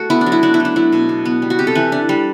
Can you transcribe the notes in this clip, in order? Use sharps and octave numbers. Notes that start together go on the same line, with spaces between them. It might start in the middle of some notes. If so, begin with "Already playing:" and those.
Already playing: A3 F#4 A4
B3 E4
D4
F#3
E4
D4 F#4
E4
A3 D4
F#3 E4
B2
D4
B3
G3
F#4
C3 G4
A4
E3 B4
D4
G3